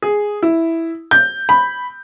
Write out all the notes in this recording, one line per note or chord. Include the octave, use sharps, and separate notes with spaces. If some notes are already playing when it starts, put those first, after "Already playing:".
G#4
E4
G6
B5